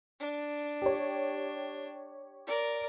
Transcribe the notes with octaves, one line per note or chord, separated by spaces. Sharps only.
D4
G4 C#5
A#4 D5